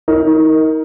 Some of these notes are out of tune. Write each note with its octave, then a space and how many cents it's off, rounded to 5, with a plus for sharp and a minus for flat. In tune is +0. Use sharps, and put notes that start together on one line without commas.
D#4 +30 A#4 +0